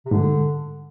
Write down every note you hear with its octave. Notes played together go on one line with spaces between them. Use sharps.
C3
G#2 D3